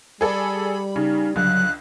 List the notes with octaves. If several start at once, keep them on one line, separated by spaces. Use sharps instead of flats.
G3 G#4 A4 D5 B5
C#3 D#4
C#2 D3 F#3 F#6